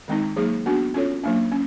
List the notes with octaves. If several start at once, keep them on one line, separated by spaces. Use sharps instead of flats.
D#3 G#3 C4 D#4
F#3 A#3 D#4 G#4
B3 D4 F#4
C#4 F4 A4 C#5
F#3 A#3 D4
C#4